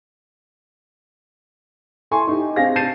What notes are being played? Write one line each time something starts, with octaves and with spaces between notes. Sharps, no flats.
E4 A4 G#5 C6 C#6
D#4 G4
C4 D4 G#4 F5 A#6
A5 G6 A6 C7 D#7